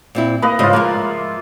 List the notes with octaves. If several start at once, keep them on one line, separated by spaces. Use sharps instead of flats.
A#2 C4 E4
A#3 B4 D#5 F5
G#2 C#3 F4 D#5 E5
F3 G#3 A#3 A#4